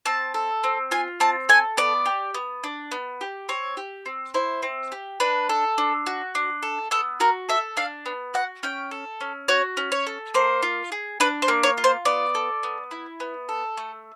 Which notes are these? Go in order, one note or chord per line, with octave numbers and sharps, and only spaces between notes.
C4 A5
A4
C4
F4 G#5
C4 A5
A4 G#5
B3 D5
G4
B3
D4
B3
G4
C4 C#5
G4
C4
E4 C5
C4
G4
D4 B4
A4
D4
F#4
D4
A4
B3 A4
F#4 A#4
A4 E5
D4 F5
B3
F#4 F#5
C#4 G5
A4
C#4
F#4 C#5
C#4
C#5
A4
A#3 C5
F4
G#4
D4 B4
C5
A#3
C#5
F4
C5
B3 D5
A4
B3
E4
B3
A4
A3